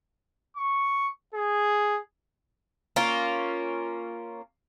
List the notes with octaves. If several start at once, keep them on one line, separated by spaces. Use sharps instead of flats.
C#6
G#4
A#3 C#4 F4